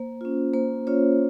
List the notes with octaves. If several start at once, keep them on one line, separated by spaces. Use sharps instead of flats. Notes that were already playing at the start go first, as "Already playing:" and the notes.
Already playing: A#3 C5
C#4 F4
A#3 C5
C#4 F4 C#5